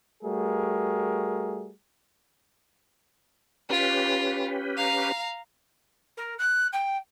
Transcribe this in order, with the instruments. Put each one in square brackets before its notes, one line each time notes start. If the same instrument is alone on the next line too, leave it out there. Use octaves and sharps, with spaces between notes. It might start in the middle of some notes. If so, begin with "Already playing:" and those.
[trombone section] G3 A3 F#4 G#4 A#4
[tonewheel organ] C#4 G4 B4 [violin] F4
[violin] F5 A#5
[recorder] A#4
F#6
G5